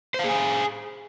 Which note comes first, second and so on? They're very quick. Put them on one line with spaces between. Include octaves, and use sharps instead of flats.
C5 F5 G#4 G#5